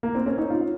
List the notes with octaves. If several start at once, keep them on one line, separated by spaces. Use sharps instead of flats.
A#3
C4
C#4
D#4
F4